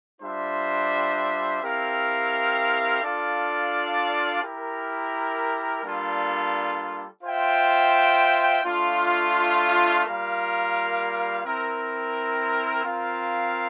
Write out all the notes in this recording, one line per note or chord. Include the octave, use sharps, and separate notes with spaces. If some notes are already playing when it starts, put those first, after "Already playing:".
G3 D4 F4 C5 E5
C4 E4 G4 A#4 F5
D4 F4 A4 D5 F5
E4 G4 A#4
G3 A#3 D4 F4 A4
F4 C5 E5 G5
A3 D4 F4
G3 A#3 F4 A#4 F5
C4 E4 A#4
C4 F4 A#4 F5